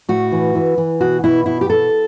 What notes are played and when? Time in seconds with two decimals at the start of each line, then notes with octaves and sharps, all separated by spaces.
0.08 A2 F#4
0.32 E3
0.55 E3
0.78 E3
1.00 B2 F#4
1.24 B2 E4
1.46 B2 E4
1.61 G4
1.70 B2 A4